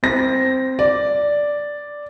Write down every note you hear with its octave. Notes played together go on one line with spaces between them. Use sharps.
C4 A#6
D5